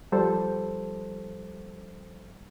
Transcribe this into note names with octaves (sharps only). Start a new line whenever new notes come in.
F3 G3 A4 C5